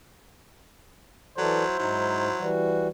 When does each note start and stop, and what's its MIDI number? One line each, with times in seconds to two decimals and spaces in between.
1.38 1.64 52
1.38 1.77 54
1.38 2.52 64
1.38 1.64 69
1.38 2.52 72
1.38 1.64 74
1.79 2.28 44
1.79 2.51 54
1.79 2.28 63
2.39 2.88 52
2.39 2.88 55
2.39 2.88 66